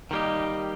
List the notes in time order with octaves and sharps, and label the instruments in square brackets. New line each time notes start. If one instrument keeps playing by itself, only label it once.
[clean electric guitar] D#3 G3 A#3 G4 [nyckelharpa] D#4